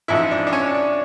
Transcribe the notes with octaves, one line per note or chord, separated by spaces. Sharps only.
A1 G#2 F3 E4
D4
D4
C#4
D4